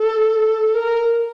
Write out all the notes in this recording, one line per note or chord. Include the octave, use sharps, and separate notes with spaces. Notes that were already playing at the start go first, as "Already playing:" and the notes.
Already playing: A4
A#4